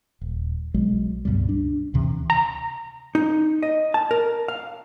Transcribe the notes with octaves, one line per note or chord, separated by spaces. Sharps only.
D#1
B1 F#3 G#3
C#2 G2 B2 G3
D4
D2 C3 E3
A#5
D#4
D#5
A5
A#4
F5